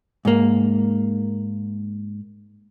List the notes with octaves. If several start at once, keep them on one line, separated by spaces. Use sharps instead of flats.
G#2 A#3